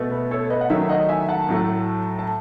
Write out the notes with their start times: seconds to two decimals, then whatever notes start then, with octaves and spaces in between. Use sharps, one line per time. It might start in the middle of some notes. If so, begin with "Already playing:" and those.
Already playing: B2 A3
0.11 B4
0.31 A4 C#5
0.50 B4 D#5
0.61 F#5
0.70 D#3 F#3 A3 C#5 E5
0.89 D#5 F#5
1.09 E5 G#5
1.29 F#5 A5
1.49 A2 F#3 A3
2.19 A5